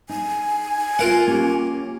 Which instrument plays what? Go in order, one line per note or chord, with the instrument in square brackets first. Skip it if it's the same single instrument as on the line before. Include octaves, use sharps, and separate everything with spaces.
[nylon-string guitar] D#4 [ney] G#5
[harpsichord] F4 A#4 F#5 [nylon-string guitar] F5
[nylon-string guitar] A#3 C#4 G4